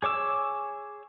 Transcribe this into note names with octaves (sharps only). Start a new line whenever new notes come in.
G#4 C#5 D6 E6